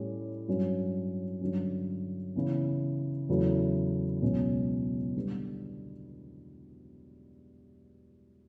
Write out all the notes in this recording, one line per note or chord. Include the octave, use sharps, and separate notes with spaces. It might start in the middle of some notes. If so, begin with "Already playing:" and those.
Already playing: A2 G3 C#4 G4
G2 F#3 C#4
G2 D3 F#3 C#4
C#3 E3 B3
E2 C#3 F#3 A3 E4
C#2 B2 F#3 C#4
D3 G3 B3